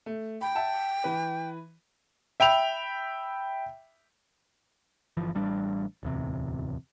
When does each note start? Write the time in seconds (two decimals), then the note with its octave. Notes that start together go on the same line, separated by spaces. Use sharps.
0.06 A3
0.41 G5 B5
0.55 E5 F#5 A5
1.04 E3 B4
2.40 E5 G5 B5 F7
5.17 G1 E3 F3
5.35 A1 G3 D4
6.03 D1 E2 C3